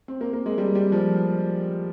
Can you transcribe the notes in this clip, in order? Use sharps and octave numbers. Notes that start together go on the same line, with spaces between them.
C4
A#3
A#3
G#3
G3
G3
F3